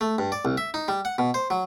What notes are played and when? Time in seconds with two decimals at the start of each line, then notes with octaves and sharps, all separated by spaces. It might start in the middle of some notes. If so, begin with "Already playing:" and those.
0.01 A3
0.18 G2
0.32 D5
0.45 C2
0.58 E5
0.74 D#4
0.88 G3
1.05 F#5
1.18 B2
1.34 C5
1.50 F#3